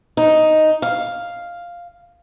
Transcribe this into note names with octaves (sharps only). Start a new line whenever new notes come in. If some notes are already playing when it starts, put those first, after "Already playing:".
D#4
F5